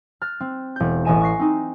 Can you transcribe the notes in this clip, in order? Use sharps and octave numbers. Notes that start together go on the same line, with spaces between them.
F6 F#6 A6
C4
E1 G6
A1 B4 D#5 G#5 D#7 E7
C#6 F#6 A#6 C7
C4 D#4